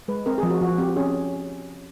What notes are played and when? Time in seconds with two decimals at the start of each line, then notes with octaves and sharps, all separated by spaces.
0.08 G#3 B4
0.26 C4 A#4
0.38 F3 G#4
0.50 F#4
0.61 F3 F#4
0.78 C4 G4
0.96 C#4 G#4